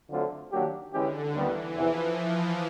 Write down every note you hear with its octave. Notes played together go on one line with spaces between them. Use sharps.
D3 F#3 A3 C4 F4
D#3 F#3 A#3 D4 G4
D3 E3 G#3 C#4 E4 G4
D#2 D#3 E3 G3 B3
E2 C3 E3 F3